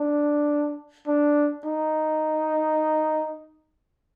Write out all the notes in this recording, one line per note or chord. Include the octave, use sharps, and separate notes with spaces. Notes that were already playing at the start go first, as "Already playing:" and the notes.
Already playing: D4
D4
D#4